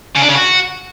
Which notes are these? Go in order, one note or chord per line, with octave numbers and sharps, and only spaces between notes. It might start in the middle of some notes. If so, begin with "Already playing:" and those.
C#3
D4
C#3
F#4